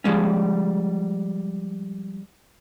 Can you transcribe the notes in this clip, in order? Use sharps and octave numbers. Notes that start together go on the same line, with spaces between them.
F3 G3 G#3 C#4